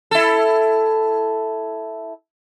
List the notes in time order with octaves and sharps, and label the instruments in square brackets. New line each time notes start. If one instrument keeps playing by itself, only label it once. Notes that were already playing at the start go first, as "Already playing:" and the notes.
[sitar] E4 A4